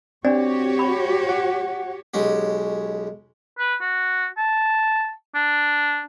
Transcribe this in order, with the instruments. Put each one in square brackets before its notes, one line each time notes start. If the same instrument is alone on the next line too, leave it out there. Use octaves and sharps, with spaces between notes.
[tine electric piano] C4 [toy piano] D4 D5 [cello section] F#4 G4 C#5
[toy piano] B5
[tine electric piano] F#5
[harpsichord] B1 G#3 C#4 F#4 G4
[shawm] B4
F#4
A5
D4